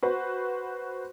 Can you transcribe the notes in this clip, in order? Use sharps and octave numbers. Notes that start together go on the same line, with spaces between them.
F#4 B4 C5